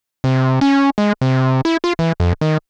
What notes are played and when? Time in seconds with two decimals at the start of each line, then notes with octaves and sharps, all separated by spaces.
0.24 C3
0.61 C#4
0.98 G#3
1.21 C3
1.65 E4
1.84 F4
1.99 E3
2.20 F2
2.41 D#3